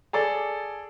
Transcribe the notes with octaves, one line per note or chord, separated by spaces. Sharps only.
G#4 A4 D5